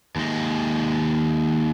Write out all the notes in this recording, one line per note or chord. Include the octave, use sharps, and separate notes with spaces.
D#2 G#3